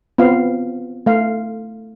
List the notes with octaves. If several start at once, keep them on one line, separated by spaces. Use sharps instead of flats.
B3 C4 F4 F5
A3 F5